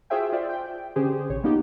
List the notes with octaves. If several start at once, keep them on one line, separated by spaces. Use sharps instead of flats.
F4 F#4 G#4 C5 E5 G5
F4 C5 D5 E5
G5
D3 C#4 G4 G#4 C5
A1 C3 C#5
A#3 B3 D#4 F4 G4